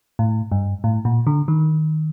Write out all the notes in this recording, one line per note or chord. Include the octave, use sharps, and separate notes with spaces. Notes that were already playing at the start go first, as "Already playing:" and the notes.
A2
G2
A2
A#2
D3
D#3